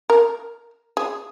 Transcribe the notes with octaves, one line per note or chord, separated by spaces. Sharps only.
A#4
G#4